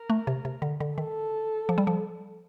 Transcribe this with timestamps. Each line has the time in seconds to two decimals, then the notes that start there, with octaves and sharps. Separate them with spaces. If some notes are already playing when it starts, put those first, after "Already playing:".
Already playing: A#4
0.10 A3
0.27 C3
0.45 C3
0.62 D3
0.80 D3
0.98 D#3 A4
1.69 F3
1.78 G3
1.87 F3